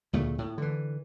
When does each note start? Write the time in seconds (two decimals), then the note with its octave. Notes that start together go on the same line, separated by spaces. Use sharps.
0.13 D2 A#2 C#3 A3
0.38 A2
0.58 D3 E3